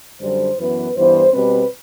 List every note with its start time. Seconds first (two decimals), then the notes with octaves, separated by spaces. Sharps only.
0.20 F#2 D3 G3 C5
0.57 F#2 E3 B3 B4
0.95 G2 E3 B3 C5
1.33 B2 G3 C4 B4